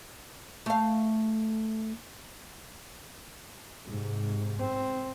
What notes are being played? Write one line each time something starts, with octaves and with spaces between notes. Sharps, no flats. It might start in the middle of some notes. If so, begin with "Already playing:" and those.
A3 F5
G#2 C3
C4